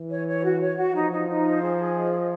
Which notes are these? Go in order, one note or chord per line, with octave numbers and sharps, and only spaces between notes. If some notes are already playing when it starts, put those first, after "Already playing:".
Already playing: E3
C#5
C#5
F#4
C#5
F#4
F3 D#4
D#4
D#4
C5
G#4
G#4
D#5
D#5